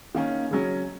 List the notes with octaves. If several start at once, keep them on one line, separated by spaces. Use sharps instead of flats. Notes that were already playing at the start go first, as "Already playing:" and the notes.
D#3 A#3 C#4
C#3 F#3 C#4